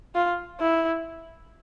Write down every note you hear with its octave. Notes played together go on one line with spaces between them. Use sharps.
F4
E4